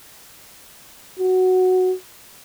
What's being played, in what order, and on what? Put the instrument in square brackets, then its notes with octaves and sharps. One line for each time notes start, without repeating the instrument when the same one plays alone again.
[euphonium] F#4